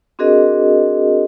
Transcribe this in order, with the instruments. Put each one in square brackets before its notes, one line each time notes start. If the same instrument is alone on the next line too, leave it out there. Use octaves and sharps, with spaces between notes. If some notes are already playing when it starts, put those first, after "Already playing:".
[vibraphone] C4 D4 F#4 G#4 A#4 D#5